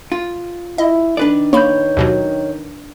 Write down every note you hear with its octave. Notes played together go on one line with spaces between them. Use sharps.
F4
E4 D#5
D#3 D4 B4 D5
A#3 C#5 B5 G6
D#2 B2 F#3